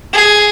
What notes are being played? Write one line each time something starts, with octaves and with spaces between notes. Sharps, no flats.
G#4